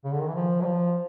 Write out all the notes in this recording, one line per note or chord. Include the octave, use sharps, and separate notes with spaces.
C#3
D3
D#3
E3
F3
F#3
F3